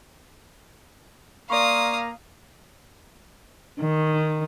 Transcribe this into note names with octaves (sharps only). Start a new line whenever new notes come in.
A#3 D5 F5 A#5 C6 C#6 D#6
D#3